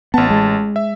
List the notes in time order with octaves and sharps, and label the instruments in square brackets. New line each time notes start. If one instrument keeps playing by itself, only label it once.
[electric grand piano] A1 A5 [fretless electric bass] B3
[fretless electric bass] G#3
[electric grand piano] E5